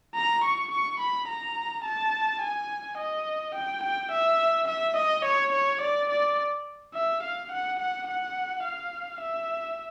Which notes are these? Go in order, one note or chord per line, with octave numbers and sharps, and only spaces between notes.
A#5
C#6
C#6
B5
A#5
A5
G#5
D#5
G5
G5
E5
E5
D#5
C#5
C#5
D5
D5
E5
F5
F#5
F#5
F#5
F5
E5